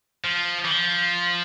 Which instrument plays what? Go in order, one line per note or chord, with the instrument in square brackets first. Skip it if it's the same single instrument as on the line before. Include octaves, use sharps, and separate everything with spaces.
[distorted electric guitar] F3
E3
F3